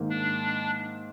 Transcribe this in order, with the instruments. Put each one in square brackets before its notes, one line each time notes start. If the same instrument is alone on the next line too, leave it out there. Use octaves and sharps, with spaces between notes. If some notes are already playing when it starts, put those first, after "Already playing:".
Already playing: [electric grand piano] G#2 D#3 A#3
[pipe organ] D4